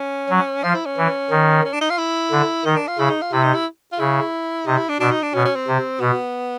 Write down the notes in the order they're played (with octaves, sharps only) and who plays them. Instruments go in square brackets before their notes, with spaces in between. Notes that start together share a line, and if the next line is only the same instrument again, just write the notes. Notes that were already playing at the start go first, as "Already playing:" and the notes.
Already playing: [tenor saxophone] C#4
[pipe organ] F#3
[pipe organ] F3 [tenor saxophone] F4
[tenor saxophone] E4
C#4
[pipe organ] E3
D#3
[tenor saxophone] C#4
D4
D#4
F4
E4
[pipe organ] D3
[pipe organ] D#3 [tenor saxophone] D#4
[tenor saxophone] D4
F4
[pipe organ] C#3 [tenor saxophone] E4
[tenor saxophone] D#4
F4
[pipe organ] C3 [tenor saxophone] E4
[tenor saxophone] D#4
E4
F4
[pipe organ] C#3 [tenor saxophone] E4
[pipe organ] C3 [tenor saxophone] D#4
[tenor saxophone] E4
D4
[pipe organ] B2 [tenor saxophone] D4
[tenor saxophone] D#4
D4
[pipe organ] B2 [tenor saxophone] C#4
[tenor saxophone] C#4
C4
[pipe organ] C3
[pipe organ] B2 [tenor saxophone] B3